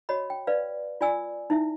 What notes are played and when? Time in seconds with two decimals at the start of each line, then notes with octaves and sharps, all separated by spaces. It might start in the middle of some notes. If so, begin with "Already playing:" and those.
0.09 F#4 C#5 D#5 B5
0.30 G5
0.47 B4 D5 F5
1.01 F4 D5 G#5 E6
1.50 D#4 E4 E5